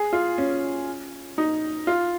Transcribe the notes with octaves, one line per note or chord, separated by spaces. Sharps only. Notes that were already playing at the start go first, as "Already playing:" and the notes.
Already playing: G#4
F4
C#4
D#4
F4